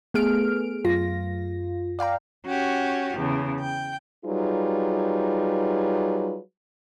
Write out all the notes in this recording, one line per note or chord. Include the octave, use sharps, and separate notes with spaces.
A3 B3 G#4 F6 D7
F#2 F4 A#6
D5 F5 G5 A#5
C#4 F#4 G4
E2 C#3
G5
F#3 G3 D#4 F4 G#4 B4